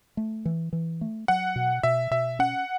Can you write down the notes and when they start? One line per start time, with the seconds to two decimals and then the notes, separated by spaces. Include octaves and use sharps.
0.17 A3
0.45 E3
0.73 E3
1.01 A3
1.28 F#3 F#5
1.56 B2
1.83 B2 E5
2.11 B2 E5
2.39 C#4 F#5